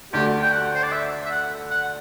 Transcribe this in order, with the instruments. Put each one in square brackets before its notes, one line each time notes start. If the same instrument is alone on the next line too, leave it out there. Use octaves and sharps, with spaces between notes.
[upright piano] D2 D3 A3 D4 F#4 [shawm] G4
[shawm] G5
F#5
C5
D5
E5
E5
F#5
F#5